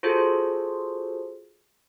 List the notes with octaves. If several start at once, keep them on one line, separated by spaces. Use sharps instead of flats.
F4 F#4 G#4 A4 C5